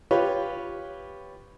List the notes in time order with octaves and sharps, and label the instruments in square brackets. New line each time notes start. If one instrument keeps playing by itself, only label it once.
[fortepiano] F4 G4 B4 C#5